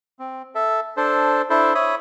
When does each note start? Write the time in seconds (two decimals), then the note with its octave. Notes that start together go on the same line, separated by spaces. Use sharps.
0.19 C4
0.55 A4 E5
0.97 D4 A4 C5
1.50 D4 E4 A4 C5
1.75 C#5 E5 B5 D#6